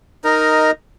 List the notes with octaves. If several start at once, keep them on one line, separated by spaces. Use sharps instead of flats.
D#4 A#4 D#5